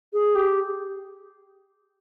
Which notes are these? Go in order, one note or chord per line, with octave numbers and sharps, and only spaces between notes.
G#4
G4